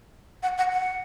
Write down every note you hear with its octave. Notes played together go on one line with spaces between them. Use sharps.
F#5
F#5
F#5